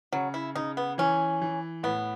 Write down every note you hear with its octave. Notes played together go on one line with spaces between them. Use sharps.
C#3 F#3
E4
C#3 D#4
B3
E3 C#4
E3
A2 B3